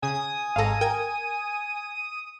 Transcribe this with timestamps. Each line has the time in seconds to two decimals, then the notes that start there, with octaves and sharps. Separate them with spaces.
0.03 C#3 G#5 D#6
0.56 G#1 G#2 A4 F5 A#5
0.81 A#4 G5 G#6